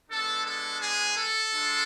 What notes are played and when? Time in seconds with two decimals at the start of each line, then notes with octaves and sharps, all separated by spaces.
0.10 G#3 B3 D4 A4
0.45 A4
0.81 G#4
1.17 A4
1.51 G#3 D4 F4